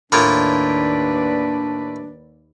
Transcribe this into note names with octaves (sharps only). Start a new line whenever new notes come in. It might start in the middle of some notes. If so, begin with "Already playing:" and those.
D#2 A2 A#3 D4 F4 B4 D5